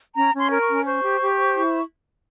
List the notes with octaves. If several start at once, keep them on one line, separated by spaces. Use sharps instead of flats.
C#4 A#5
C#4
C6
A#4
C#6
C#4
C5 C#6
G4
G4
C5
E4